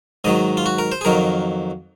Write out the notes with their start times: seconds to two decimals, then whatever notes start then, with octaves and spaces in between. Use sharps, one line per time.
0.24 G#2 D#3 F#3 D#5
0.57 F4
0.66 F#4
0.79 A#4
0.92 C5
1.01 G#4
1.05 F2 D#3 F#3 A#4